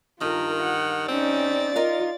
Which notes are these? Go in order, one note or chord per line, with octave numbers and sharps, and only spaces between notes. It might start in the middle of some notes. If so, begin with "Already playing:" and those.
G2 D#3 F4 A#4
F#5
C4 C#4 D#4 D5 A6
D#4 F4 A#4 F5